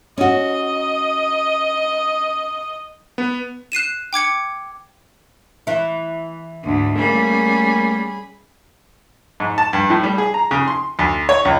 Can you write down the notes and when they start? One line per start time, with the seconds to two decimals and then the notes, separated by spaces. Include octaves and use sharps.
0.18 C#4 F#4 D#5
3.18 B3
3.72 F#6 C7 D#7 E7
4.13 G5 D6 G#6 C#7
5.67 E3 E4
6.63 D2 G#2
6.96 G3 A3 A#3 C#4 G#4 B5
9.40 G#2
9.58 A5
9.73 G2
9.90 A2
10.03 G3
10.18 G#4
10.34 A#5
10.51 C#3
10.68 C6
10.99 D2
11.29 C#5
11.45 C#2